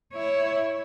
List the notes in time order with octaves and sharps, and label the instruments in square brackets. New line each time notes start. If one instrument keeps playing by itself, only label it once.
[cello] E4 C#5